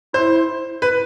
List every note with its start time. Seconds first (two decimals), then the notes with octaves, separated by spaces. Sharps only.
0.13 E4 C5
0.82 B4